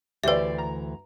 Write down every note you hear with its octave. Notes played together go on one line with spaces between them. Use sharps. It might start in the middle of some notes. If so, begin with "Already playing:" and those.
D2 E3 G4 B4 C5 D5 E5
A#5